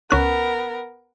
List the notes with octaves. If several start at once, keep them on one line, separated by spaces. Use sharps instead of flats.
C#2 B3 C#4 A#4 F#6